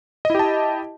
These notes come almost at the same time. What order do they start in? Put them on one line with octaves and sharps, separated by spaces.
D#5 E4 G4 A5